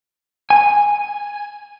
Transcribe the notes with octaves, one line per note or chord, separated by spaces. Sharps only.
G#5